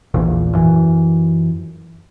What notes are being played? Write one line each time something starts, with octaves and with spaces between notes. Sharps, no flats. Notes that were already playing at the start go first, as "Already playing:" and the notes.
A#1 E2 A#2
F#2 E3